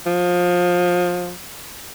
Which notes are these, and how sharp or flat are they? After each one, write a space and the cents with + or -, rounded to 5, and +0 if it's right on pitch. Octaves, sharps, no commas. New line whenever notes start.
F3 +25